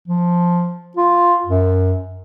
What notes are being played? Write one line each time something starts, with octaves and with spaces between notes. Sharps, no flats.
F3
F4
F#2